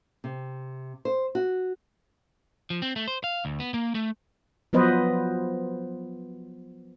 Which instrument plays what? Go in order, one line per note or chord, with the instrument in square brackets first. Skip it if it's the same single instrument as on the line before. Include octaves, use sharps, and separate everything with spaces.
[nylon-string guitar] C3
C5
F#4
[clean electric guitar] F3
C4
A3
C5
F5
D2
B3
A#3
A3
[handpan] F3 F#3 B3 B4 C5 D#5